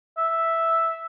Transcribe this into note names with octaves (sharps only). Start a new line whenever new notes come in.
E5